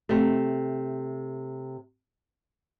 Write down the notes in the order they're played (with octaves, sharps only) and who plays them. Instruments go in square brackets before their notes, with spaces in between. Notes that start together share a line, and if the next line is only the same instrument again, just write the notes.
[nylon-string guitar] C3 A3